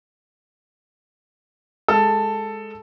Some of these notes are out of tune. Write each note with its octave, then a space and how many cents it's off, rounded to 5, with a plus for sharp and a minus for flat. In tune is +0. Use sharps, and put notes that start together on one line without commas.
G#3 +0 A4 +5